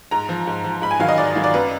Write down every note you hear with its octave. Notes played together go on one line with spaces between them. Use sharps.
G#2 A#5
F3
G#2
F3
G#2 B5
G#5
D#3 F#3 F5
D#5
G#2 D5
D#3 F#3
D5
F#2 B4